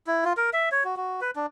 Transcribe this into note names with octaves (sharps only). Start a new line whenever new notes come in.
E4
F4
A#4
E5
C#5
F#4
F#4
B4
D4